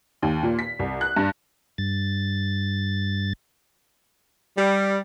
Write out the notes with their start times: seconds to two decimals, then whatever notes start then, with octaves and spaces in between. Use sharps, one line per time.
0.22 D#2
0.43 A#2
0.59 B6
0.79 C2
1.01 F#6
1.17 G2
1.78 G2 A6
4.57 G3